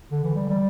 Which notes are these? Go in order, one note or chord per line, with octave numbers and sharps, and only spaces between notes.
D3
E3
G3
G3